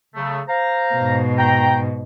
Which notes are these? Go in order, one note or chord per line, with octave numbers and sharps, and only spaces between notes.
C#3 F#3 A3
C5 F5 A#5
G#2 B2
G5 A#5